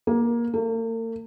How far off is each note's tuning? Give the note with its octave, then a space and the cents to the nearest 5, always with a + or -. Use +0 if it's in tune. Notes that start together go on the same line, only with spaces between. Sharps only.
A#3 +15
A#3 -45